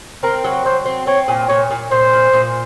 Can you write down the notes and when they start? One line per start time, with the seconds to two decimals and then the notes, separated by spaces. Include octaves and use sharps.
0.23 C4 A#4
0.44 F#3
0.65 F#3 C5
0.86 C4
1.07 C4 C#5
1.28 A#2
1.49 A#2 C#5
1.71 A#2
1.91 A#2 C5
2.13 F3
2.34 A#2